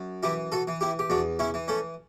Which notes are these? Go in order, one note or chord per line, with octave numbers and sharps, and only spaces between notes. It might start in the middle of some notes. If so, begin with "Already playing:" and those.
Already playing: F#2
E3 E4 G4
F#4 A4
E3
E4 G4
G4
E2 D4 F#4
C#4 E4
E3
A3 C#4